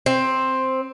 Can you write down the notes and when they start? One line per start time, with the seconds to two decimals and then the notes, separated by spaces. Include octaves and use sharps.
0.06 C4